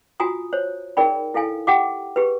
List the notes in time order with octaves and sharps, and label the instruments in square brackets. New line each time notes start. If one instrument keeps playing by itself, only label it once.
[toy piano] F4 F#4 G#5 A#5 D#6
C5 C#5
D#4 G#4 A#4 D5 G5 B5
E4 A4 F5 G#5
G4 F#5 G5 D6
G4 G#4 B4